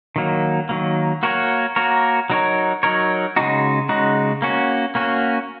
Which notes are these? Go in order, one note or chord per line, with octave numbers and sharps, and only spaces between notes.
D#3 F#3 A#3
D#3 F#3 A#3
A#3 F#4 A#4 C#5
A#3 F#4 A#4 C#5
F#3 D#4 A#4 C#5
F#3 D#4 A#4 C#5
C#3 G#3 D#4 F#4
C#3 G#3 D#4 F#4
A#3 C#4 F#4
A#3 C#4 F#4